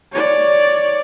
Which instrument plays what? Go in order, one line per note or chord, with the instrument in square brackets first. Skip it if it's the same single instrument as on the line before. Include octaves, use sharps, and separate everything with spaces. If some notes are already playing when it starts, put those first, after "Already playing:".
[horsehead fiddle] C#5 D5